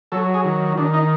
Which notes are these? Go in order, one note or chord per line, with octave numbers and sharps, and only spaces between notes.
F#3 A4
G#4
D#3
D#3 D4
D#4